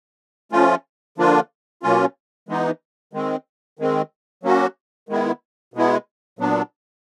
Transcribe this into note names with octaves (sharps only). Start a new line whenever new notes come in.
F3 A3 C#4 F4
D3 F3 A#3 D4 F4
B2 F#3 A#3 C#4 F4
E3 G#3 B3 D#4
D#3 G#3 C4
D#3 G#3 C4
F#3 A#3 C#4 F#4
D#3 G#3 B3 E4
B2 G#3 B3 E4
A#2 F#3 B3 D4